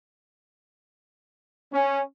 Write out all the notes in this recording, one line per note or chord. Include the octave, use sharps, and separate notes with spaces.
C#4